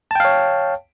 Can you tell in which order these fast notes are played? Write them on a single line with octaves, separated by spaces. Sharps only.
A5 G5 F5 C#5